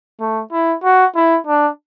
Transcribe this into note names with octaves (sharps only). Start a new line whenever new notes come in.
A3
E4
F#4
E4
D4